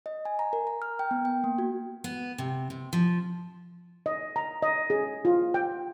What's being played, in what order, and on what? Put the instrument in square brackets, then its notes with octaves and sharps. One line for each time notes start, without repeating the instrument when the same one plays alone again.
[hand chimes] D#5
G#5
A#5
A#4
A#5
F6
G5
B3
G5
A#3
F#4
[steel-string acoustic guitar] B3
C3
C3
F3
[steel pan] D#5
A#5
D#5
G#4
F4
G5